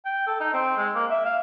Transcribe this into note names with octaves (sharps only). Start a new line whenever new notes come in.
G5
A4
D#4
C4
G#3
A#3
E5
F5